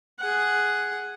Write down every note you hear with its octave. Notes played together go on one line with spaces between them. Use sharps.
G#4 F#5